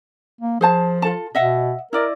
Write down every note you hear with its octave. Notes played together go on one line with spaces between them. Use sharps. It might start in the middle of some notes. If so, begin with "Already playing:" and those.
A#3
F3 G#4 C5 A5
F4 A4 A5
B2 D#5 E5 F#5
E4 A#4 D5 D#5